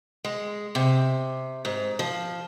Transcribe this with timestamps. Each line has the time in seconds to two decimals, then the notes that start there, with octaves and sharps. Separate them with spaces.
0.24 G#3
0.75 C3
1.65 G#2
1.99 F3